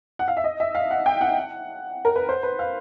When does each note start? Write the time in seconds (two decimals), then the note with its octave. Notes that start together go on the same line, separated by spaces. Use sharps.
0.19 F#5
0.28 F5
0.37 E5
0.44 D#5
0.60 E5
0.75 F5
0.91 F#5
1.06 G5
1.21 F#5
2.05 A#4
2.16 B4
2.29 C5
2.43 B4
2.59 F5